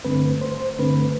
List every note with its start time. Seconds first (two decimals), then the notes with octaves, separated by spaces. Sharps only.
0.05 G2 D3 A3 C4 B4
0.41 C5
0.79 G2 D3 A3 C4 B4